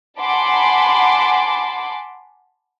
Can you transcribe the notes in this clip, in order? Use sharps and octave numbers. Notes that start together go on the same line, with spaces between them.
F#5 G#5 A5 B5 C6 D6